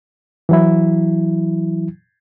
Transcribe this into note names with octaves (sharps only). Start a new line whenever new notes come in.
E3 F#3 E4